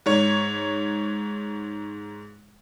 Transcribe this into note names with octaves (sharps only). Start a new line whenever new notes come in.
G#2 C#5